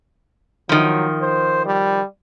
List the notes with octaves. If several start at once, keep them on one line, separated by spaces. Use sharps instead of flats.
D#3 F3 F#3
C5
G3